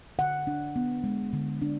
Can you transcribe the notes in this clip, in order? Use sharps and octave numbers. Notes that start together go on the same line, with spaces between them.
D3 F#5
D4
B3
G#3
D3
D4